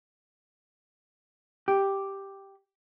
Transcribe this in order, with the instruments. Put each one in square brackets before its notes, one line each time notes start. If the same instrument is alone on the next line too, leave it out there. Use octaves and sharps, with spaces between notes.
[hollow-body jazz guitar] G4